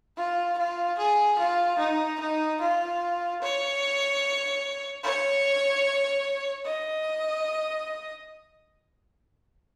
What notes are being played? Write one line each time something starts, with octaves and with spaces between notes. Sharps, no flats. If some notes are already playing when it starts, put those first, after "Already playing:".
F4
F4
G#4
F4
D#4
D#4
F4
C#5
C#5
D#5